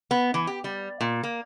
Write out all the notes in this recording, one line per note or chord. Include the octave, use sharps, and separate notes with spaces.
B3
E3
G4
G3
A#2
A#3